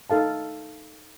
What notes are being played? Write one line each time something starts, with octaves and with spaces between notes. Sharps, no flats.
D#4 A4 F5 A5